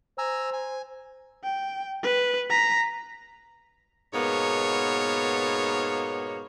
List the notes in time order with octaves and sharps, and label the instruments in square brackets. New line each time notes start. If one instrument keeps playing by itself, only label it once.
[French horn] C5 [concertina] G#5 A#5 E6
[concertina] G#5
[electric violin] G5
B4
A#5 B6
[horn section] G#2 B2 A#3 B3 C#5